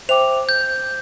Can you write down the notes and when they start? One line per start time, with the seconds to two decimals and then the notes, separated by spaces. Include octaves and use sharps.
0.09 C5 E5 G5 D6 F7
0.49 G6